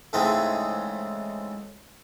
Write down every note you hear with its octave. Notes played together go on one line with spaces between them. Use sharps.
G#2 C#3 E3 G#3 A3 C4